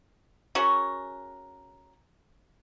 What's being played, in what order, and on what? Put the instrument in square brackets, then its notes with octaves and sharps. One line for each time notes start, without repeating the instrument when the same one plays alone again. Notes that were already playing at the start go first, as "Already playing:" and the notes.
[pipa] C#4 F#4 G#4 A#4